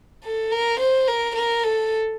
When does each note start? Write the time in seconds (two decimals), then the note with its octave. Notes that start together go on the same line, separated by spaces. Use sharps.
0.24 A4
0.51 A#4
0.80 C5
1.08 A#4
1.36 A#4
1.64 A4